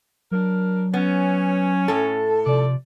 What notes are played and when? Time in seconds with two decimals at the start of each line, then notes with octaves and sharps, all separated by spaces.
0.31 F#3 D4 A#4
0.94 B3 C#4
1.88 A2 A4
2.46 C3 F3 D5